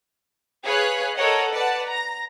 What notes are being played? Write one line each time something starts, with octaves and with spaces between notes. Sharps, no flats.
G#4 B4 C#5 F5 F#6
A4 A#4 C#5 D#5 F#5
B4 D5 F#5 A5
A#5 A#6